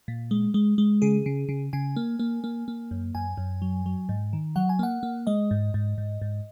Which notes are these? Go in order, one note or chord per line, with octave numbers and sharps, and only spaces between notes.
A#2
G#3
G#3
G#3
C#3 G#4
C#3
C#3
C#3 G#5
A#3
A#3
A#3
A#3
F#2
F#2 G#5
F#2
F#3
F#3
G#2
D#3
F#3 F#5
G#5
A#3 F#5
A#3
G#3 D#5
G#2
G#2
G#2
G#2